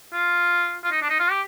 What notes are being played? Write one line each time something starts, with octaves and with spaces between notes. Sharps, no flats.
F4
F4
D#4
D4
D#4
F4
G4